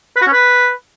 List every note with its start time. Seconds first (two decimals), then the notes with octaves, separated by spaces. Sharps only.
0.16 B4
0.22 F#4
0.27 C#4
0.33 B4